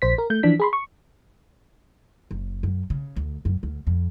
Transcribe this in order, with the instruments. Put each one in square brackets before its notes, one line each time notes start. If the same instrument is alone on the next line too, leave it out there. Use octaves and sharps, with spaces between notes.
[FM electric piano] A#1 C5 B6
A#4
A3 G6
E3 F3 D4 B6
G#4 B5 C6
C#6
[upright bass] F#1
F#2
C#3
D2
F#2
D2
F2